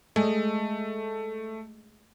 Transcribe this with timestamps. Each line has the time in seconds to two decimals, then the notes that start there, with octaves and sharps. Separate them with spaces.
0.16 G#3 A3